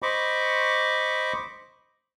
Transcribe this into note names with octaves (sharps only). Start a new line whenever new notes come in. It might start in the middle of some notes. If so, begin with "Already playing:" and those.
C5 D#5 B5 C#6 D6